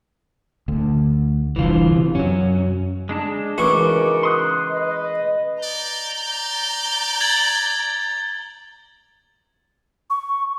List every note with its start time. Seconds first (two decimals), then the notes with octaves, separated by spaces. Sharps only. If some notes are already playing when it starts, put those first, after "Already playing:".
0.68 D2 D3
1.56 F1 C2 D3 E3 F4
1.96 C3
2.15 F#2 F#3 C#4
3.09 G#3 D4 A5
3.58 C#2 C#3 E3 D#4 F#4 A#4 C#6 D6
4.23 C6 D#6 F#6
4.70 B4 D#5
5.63 D5 A#5 G6
6.14 D5
7.21 G#6 A6 F#7
10.10 C#6